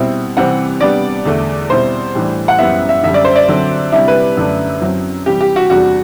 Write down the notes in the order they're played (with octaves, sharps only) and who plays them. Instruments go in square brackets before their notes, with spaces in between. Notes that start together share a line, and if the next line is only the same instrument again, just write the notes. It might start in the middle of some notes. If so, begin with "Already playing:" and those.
Already playing: [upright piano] B2 G3 C4 E4
[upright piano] C3 E3 G3 C4 [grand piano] F#5
[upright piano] C3 G3 B3 D4 [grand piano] D5
[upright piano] E2 D3 A3
[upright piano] B2 G3 C4 E4 [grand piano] C5
[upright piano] A2 E3 G3 D4
[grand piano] F#5
[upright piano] F#2 E3 G3 B3 E4 [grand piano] E5
[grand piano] E5
[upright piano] F#2 D3 G3 [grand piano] E5
[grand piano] D5
C5
D5
[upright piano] D3 F#3 C4
[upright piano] C3 G3 D4 [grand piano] E4
[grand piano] B4
[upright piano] F#2 D3 A3 D4
F#2 F#3 C4 E4
[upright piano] C3 E3 G3 [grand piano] G4
[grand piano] G4
F#4
[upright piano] E2 C3 G3 D4 [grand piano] F#4